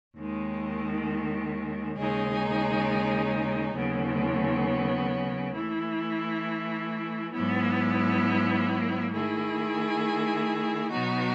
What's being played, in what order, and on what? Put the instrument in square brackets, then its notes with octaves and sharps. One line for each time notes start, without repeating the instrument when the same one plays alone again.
[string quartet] D#2 D#3 G#3
D#2 C#3 G#3 D#4 G#4
D#2 C#3 F#3 B3
E3 A3 E4
G#2 F#3 B3 E4
D#3 A3 E4 G#4
B2 F#3 B3 D#4 F#4